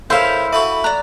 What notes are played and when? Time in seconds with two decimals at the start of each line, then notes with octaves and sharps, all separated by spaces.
0.10 C#3 E4 A4 A#4 C5 F5 G6
0.53 F#4 A4 E5 B5
0.84 D5 A#5 F#6